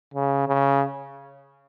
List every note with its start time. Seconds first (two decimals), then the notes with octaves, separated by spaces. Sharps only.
0.14 C#3
0.48 C#3